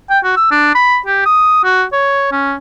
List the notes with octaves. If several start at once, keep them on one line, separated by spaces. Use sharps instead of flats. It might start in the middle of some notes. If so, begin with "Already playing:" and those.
G5
F#4
E6
D4
B5
G4
D#6
F#4
C#5
C#4